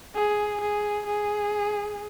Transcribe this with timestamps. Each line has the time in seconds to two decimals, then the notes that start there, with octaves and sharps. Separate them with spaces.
0.15 G#4
0.61 G#4
1.07 G#4